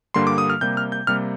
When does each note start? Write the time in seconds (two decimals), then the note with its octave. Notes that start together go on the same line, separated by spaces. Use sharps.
0.14 G2 D3 G3 A#3 C6
0.27 D6
0.38 D#6
0.50 F6
0.61 C3 G3 A#3 G6
0.77 F6
0.92 G6
1.07 C3 G3 A#3 F6